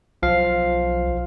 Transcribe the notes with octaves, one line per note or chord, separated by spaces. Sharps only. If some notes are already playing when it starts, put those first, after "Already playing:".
B1 F3 F5